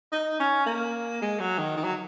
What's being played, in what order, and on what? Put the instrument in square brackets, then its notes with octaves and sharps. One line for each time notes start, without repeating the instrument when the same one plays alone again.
[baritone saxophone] D#4
C#4
A#3
G#3
F#3
D#3
D#3
F#3